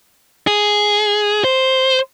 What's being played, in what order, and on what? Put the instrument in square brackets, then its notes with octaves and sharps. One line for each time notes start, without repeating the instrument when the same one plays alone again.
[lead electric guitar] G#4
C5